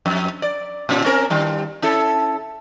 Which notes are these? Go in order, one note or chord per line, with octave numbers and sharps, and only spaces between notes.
F2
D5
A#2 C#4 F4
C4 C#4 A#4
G2 D#3 G3
C#4 E4 A4